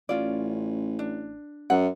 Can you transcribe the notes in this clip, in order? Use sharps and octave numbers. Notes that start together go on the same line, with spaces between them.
A1 C#4 F4 D5
D4
F#2 F#5